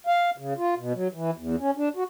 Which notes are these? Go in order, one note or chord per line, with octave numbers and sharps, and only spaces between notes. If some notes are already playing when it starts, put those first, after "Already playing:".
F5
C#3
F4
B2
F#3
E3
E2
C#4
D4
F#4